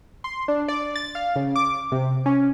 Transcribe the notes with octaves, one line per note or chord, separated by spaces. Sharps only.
C6
D4
D5
A6
F5
C#3
D6
C3
C#4